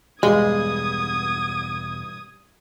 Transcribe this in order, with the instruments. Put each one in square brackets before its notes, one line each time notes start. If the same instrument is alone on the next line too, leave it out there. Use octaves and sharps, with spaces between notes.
[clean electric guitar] E2 B2 B3 [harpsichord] G2 F5 [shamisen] G#3 [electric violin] D#6 G#6